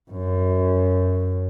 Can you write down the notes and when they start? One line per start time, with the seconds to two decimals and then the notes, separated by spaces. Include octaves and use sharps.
0.11 F#2